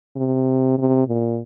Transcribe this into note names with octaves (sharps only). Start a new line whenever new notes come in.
C3
C3
A#2